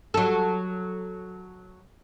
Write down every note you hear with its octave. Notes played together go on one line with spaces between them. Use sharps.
F#3 A4